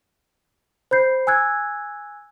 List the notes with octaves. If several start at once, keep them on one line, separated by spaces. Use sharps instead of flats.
C5 B5 G6 C7
G#5 E6 F#6 G#6